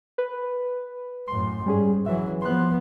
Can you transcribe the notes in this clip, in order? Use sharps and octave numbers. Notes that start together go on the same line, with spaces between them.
B4
F#2 A2 C6
G#2 G3 C#4 G#4
E3 F#3 E5
F3 B3 C6 F#6